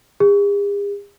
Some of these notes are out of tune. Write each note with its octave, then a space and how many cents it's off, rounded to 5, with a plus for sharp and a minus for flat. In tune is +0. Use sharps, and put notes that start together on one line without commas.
G#4 -45